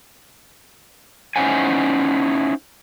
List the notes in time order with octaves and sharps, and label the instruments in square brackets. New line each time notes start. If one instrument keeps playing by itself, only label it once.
[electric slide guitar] C#4 D#4 E4 C5 F#5 G#5